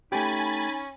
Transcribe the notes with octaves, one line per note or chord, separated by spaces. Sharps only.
A3 C#4 D#4 G4 G#5 B5 A6